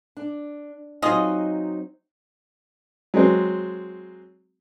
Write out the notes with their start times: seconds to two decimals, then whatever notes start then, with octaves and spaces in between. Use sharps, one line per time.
0.17 D4
1.02 F#3 C4 D#4 F4 G#4 D#5
3.14 F#3 G#3 C4